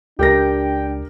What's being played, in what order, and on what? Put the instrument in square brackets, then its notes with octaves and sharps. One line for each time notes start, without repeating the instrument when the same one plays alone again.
[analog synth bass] C#2 [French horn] D4 [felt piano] G4 A#4 A#6 [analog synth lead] G5